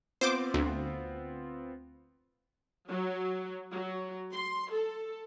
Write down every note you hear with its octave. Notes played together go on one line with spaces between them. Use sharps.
B3 C4 F4 C5 D6
D2
F#3
F#3
C6
A4